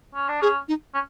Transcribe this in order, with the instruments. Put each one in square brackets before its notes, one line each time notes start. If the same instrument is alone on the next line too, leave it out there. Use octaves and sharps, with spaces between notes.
[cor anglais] C#4
D4
[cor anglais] C#4 [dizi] G#4
[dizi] D#4
[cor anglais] C#4